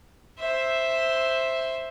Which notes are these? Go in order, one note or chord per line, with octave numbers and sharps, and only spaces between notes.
C5 E5